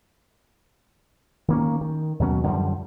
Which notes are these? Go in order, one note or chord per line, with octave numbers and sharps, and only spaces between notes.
D#3 A#3 C#4
D#3
D#2 B2 F#3 C#4
F#2 D3 F3 G3